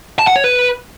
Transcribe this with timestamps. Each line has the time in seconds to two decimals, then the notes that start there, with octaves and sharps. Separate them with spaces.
0.19 A5
0.27 F#5
0.36 C#5
0.44 B4